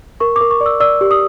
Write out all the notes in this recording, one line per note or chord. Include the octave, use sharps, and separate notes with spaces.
A#4 C#6
D6
A#4
C#6
D5
E6
D5 E6
G4
D#6